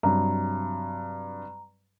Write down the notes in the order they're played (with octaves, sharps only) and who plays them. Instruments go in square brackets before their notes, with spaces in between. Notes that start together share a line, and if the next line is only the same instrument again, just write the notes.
[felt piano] G2 C3 F#3 [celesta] A#5